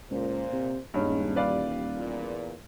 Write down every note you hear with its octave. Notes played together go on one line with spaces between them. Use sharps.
C#2 A#2 C5
C3
D#1 G2 G#3 C#4 D#4
E3 G3 B4 D5 F5
E2 A#2